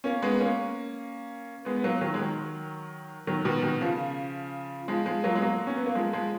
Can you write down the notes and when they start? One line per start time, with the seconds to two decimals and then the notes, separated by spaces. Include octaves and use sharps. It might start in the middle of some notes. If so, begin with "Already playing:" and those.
0.04 A#3 C#4
0.22 G#3 B3
0.40 A#3 C#4
1.65 G#3 B3
1.77 B3
1.83 F#3 A#3
2.01 D#3 F#3
2.14 G#3
2.19 D#3 F#3
3.27 D#3 F#3
3.45 B2 D#3
3.63 B2 D#3
3.81 C#3 F3
4.88 F3 G#3
5.06 F3 G#3
5.24 F#3 A#3
5.35 G#3
5.41 F#3 A#3
5.67 C#4
5.76 B3
5.86 A#3
5.95 F3 G#3
6.13 F3 G#3